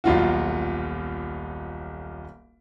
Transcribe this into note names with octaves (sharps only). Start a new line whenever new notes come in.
D#1 B1 F4 F#4